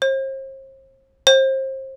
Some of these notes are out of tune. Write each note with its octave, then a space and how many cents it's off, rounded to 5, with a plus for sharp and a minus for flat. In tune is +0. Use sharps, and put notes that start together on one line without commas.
C5 +40
C5 +30